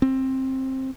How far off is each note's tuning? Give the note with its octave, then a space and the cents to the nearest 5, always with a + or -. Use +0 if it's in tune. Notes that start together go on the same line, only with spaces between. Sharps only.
C4 +15